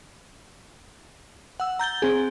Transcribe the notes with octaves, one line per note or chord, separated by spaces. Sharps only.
F#5 E6
A#5 G6 A6 G7
C4 G#4